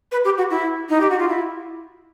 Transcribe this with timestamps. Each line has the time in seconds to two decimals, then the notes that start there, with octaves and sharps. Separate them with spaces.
0.12 B4
0.25 G4
0.38 F#4
0.50 E4
0.89 D#4
1.01 G4
1.10 F#4
1.19 F4
1.28 E4